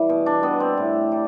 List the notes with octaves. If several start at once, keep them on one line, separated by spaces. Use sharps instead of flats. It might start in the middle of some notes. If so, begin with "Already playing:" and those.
Already playing: E3 G3
B2
D4
G3 B3
C4
A2
G3